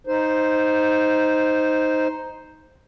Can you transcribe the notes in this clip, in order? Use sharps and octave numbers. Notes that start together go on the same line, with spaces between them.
D#4 C5